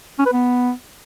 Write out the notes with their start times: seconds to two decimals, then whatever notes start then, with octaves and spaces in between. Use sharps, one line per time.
0.19 C#4
0.26 B4
0.33 B3